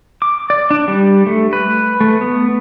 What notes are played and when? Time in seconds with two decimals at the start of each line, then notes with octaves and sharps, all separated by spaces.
0.22 D6
0.50 D5
0.71 D4
0.88 G3
1.27 A3
1.53 B4
2.01 A3
2.21 B3